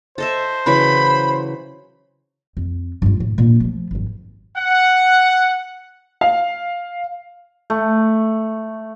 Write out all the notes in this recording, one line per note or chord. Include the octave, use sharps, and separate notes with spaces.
A4 C5 D#5 E5
C#3 E3 F#3 B5
F2
G2 F4
A2
A#2 D4
F3 A3
G#1 F#2
F#5
F5
A3